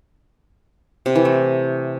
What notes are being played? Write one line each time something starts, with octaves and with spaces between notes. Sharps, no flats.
C3
E3
A3